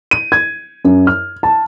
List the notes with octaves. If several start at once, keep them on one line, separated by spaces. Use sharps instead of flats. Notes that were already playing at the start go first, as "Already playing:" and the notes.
D#7
G#6
F#2
F6
A5